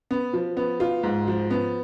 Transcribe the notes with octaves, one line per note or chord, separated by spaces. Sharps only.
B3
F3
B3
F4
G#2
F3
B3